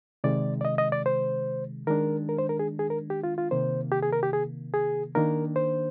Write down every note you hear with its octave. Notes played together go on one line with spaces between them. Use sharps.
C3 D#3 G#3 D5
D5
D#5
D#5
D5
C5
D#3 G#3 D4 A#4
A#4
C5
A#4
G#4
G#4
A#4
G4
F4
F4
C3 D#3 A#3 C5
G4
G#4
A#4
G4
G#4
G#4
D#3 A#3 D4 A#4
C5